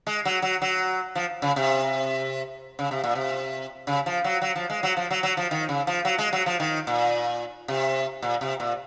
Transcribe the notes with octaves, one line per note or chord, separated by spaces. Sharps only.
G#3
F#3
F#3
F#3
F3
C#3
C3
C#3
C3
A#2
C3
C#3
F3
F#3
F#3
F3
G#3
F#3
F3
F#3
F#3
F3
D#3
C#3
F3
F#3
G#3
F#3
F3
D#3
A#2
C3
A#2
C3
A#2